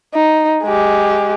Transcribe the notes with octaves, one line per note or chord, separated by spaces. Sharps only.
D#4
G#3 G4